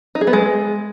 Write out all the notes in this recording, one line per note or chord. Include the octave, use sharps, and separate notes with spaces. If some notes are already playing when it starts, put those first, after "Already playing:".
D#4
G#4
B3
G#3